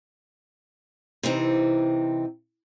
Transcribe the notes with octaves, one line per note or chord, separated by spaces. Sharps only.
C3 E3 C4 D#4